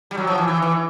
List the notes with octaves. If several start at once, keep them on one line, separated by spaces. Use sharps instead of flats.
G3
F#3
F3
E3
E3
E3